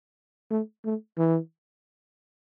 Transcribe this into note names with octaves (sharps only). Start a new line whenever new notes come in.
A3
A3
E3